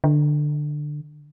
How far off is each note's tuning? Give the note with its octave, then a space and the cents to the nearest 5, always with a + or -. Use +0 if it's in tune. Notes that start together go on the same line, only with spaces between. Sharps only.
D3 +15